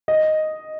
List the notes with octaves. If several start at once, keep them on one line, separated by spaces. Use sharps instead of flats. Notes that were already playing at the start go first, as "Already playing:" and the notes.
D#5